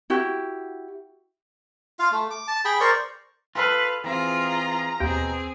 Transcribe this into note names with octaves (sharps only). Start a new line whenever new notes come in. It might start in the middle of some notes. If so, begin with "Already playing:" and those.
E4 F#4 G4
F4 F5
A3
D6
A5
G#4 G5 B5
A#4 C5 D5 C#6
F4 A4 B4 F5
E3 C4 F4 G#4 A#5
D#2 B2 C4 G#4 G5